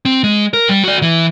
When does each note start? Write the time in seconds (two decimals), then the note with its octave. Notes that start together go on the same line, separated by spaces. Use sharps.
0.05 C4
0.24 G#3
0.53 A#4
0.69 G3
0.84 F#4 D5
1.02 E3